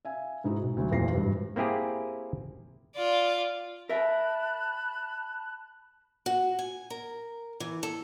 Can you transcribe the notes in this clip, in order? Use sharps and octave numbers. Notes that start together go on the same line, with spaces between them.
E5 F5 G#5
G#2 D#4 E4 F#4
B1
D2 F#3
F2 A#2 E3 F4 A#6 C7
G#1 G2
A#3 C4 E4 G4 G#4
F4 D5
A#4 E5 A5 B5 F#6
F#4
G#5
A#4
E3
A4